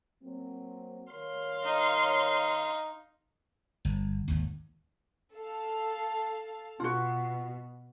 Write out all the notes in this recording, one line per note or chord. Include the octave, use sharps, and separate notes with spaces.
F#3 A#3 C4
D#3 A#4 C#5 F5 C6
D#4
G1
G#1 D#2
A4 F5
B2 F4 F#4